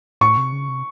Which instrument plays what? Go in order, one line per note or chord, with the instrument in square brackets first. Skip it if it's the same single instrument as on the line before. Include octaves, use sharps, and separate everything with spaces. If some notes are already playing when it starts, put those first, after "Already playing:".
[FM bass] A2 [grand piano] C#6
[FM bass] C3
C#3
C3